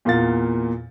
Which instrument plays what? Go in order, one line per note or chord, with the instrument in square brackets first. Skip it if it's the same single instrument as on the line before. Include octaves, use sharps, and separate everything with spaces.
[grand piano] E2 A#2 A#3 F5 A6